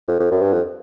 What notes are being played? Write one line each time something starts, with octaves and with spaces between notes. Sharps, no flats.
F2
F2
F#2
G2
F2